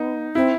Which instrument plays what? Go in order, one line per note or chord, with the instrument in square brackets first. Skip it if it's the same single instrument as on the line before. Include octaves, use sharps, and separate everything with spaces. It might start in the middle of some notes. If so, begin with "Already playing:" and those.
Already playing: [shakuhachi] B3 [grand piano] D#4
[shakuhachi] C4 [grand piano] E4